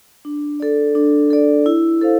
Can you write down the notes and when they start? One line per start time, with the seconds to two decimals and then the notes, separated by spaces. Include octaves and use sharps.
0.25 D4
0.60 A4 D5
0.95 D4
1.31 A4 D5
1.66 E4
2.01 A4 C5 F5